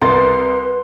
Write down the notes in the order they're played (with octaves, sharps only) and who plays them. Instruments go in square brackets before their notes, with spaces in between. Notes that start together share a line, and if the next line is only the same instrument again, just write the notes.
[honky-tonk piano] C2 A#4 A6 [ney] B4 [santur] C6